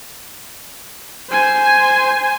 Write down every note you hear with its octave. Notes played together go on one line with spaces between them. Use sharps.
C5 G#5